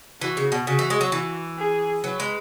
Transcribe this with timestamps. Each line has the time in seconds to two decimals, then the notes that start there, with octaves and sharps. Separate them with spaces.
0.21 E3 F#4
0.37 C#3
0.52 B2
0.67 C#3 F#4
0.79 E3
0.90 G#3
1.01 F#3
1.12 E3
1.58 G#4
2.04 F#3 B4
2.20 G#3